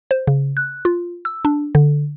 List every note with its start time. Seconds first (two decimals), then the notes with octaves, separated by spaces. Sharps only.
0.11 C5
0.27 C#3
0.57 F#6
0.85 F4
1.25 E6
1.45 D4
1.75 D3